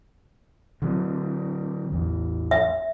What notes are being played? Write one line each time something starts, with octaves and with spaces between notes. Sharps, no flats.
D3 F#3 C4
A1 E2
E5